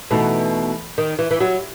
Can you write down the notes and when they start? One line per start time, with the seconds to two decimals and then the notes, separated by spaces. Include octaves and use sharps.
0.10 B2 E3 A3 D#4 A4
0.98 D#3
1.19 E3
1.31 E3
1.40 F#3